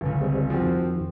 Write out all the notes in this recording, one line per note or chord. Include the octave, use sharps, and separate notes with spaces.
G1 C#2
G3 G#3 C4
F3 C4 F#4 G#4
F2 D#3